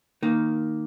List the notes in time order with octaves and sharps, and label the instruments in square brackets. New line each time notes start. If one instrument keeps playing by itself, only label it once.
[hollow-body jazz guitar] D#3 A#3